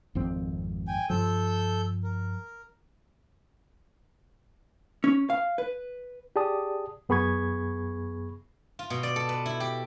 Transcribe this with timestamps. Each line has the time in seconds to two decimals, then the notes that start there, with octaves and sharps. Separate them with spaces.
0.15 G#1 F2 C4
0.88 G5 G#5
1.10 G2 F3 A4 E6 G6
2.04 A#4
5.04 C#4
5.30 F5
5.58 B4
6.36 G4 G#4 D5 A5 D#6
7.09 F#2 B3 G#4 B5 C#6 G#6
8.79 F4
8.90 B2
9.03 D5
9.16 A4
9.29 B4
9.46 E4
9.60 G4